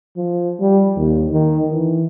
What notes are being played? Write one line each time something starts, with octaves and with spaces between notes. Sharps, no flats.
F3
G3
D#2
D#3
E3